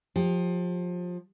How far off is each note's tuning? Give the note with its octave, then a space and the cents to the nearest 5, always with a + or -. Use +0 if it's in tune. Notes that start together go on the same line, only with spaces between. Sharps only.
F3 +25 G4 +20